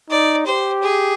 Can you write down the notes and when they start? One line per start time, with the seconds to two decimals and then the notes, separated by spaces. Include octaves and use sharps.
0.10 D#4 D5
0.46 G4 C5
0.82 G#4